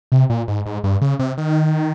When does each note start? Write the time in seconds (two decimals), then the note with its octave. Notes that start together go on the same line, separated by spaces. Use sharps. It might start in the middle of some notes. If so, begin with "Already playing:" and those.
0.12 C3
0.30 A#2
0.48 G#2
0.66 G#2
0.84 G2
1.01 C#3
1.19 C3
1.38 D#3